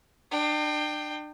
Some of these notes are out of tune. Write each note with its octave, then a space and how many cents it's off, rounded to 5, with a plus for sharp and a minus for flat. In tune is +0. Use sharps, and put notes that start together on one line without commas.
D4 +35 G5 +0